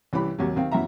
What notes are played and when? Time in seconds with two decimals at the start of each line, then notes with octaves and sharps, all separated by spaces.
0.13 C2 E3 C#4 G4 B5
0.39 D#2 C3 F#3
0.56 D#3 C4 F5
0.72 F#2 B2 E3 E5 A#5